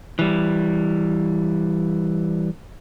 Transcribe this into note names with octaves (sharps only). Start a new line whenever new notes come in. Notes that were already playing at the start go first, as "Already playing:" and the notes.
E3 G3